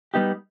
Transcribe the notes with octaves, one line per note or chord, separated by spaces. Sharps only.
G3 B3 D#4 G4